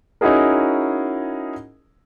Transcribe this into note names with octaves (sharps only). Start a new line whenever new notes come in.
C#4 D#4 E4 F#4 G#4 A#4